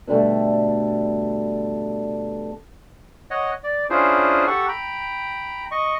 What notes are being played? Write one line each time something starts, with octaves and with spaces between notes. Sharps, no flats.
B2 D3 G3 A3
C#5 D#5 F#5
D5
C#4 D4 E4 F4 G#4 C5
G4 A4 F#5 C#6
G5 A#5 B5
D#5 C#6